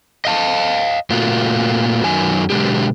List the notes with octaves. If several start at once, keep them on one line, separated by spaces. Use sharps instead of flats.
D#5 F5 A5
A#2 A3 A#3 F4 F#4
F#2 D#3 F#3 G#5
B2 D3 F#3 G#3 G4